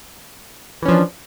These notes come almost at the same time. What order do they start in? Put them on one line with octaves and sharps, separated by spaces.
E3 C#4 F3 D4